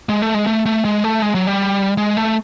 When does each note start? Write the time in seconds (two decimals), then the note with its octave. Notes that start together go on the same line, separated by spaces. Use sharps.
0.09 G#3
0.22 A3
0.34 G#3
0.47 A3
0.66 A3
0.85 G#3
1.04 A3
1.22 G#3
1.35 F#3
1.47 G3
1.97 G#3
2.17 A3